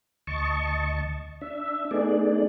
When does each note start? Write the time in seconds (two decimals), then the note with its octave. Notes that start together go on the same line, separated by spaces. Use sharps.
0.27 D2 D#5 A5 C#6
1.41 D4 E5
1.91 A3 B3 D4 D#4 G#4 D5